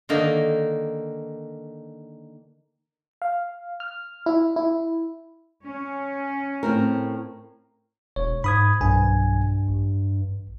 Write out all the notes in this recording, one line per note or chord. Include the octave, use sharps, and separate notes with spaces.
D3 D#3 A#3 D#4
F5
F6
E4
E4
C#4
A2 C4 A#4
E1 C#5
G#2 B5 D#6 G#6
B1 G2 G#5
A1